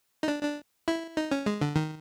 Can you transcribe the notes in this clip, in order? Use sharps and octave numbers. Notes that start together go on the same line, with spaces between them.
D#4
D4
D4
E4
D#4
C#4
G#3
D3
D#3